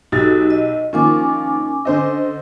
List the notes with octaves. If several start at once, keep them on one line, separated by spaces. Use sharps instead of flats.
B1 D#4 F#4 G4 A4 A6
D#5
D#3 F3 A#3 C#4 G#5 D6
D3 C5 D#5